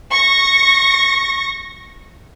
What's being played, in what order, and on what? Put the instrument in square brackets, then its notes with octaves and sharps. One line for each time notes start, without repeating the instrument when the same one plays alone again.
[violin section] C#6 A#6